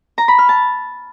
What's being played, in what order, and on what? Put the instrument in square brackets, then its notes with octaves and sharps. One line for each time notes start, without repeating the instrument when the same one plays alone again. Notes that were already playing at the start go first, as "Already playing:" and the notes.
[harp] A#5
B5
F6
A5